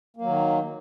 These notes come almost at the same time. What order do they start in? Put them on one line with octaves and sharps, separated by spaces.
A#3 F#3 D#3